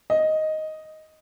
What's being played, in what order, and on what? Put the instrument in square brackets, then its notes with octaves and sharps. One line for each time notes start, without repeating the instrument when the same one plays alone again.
[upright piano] D#5